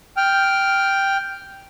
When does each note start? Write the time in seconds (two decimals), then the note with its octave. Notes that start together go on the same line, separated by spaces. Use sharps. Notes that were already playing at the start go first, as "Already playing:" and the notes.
0.17 G5 F6